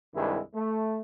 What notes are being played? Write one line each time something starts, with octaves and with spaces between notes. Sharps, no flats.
C2 G2 D#3 G#3 E4
A3